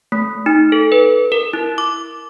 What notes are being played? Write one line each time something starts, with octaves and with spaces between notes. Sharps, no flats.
A3
D#4
A4
B4
A#4
E4
D6